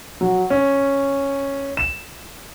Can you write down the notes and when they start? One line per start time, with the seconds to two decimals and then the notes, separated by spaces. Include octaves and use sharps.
0.21 F#3
0.50 C#4
1.77 E7